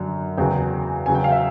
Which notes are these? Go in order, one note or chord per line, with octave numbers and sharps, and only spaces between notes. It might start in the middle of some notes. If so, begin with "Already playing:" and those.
Already playing: F#2 D3 F#3
E2 C#3 F#3 G5
E2 C#3 F#3 G#5
G5
F5
E5